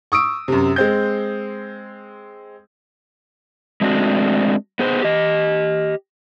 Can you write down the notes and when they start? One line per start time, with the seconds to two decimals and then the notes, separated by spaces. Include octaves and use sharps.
0.12 C#6 D#6 E6 D7
0.48 F#2 C3
0.76 G#3 C4 G6
3.81 G#3 A3 C4 D4 F#4
4.79 B3 G#4 C5
5.02 G4 D#5